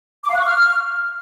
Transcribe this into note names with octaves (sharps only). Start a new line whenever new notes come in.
D6
F5
F#6
C#6
F6